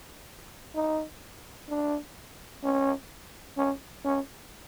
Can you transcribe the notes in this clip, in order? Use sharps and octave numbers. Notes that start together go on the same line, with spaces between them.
D#4
D4
C#4
C#4
C#4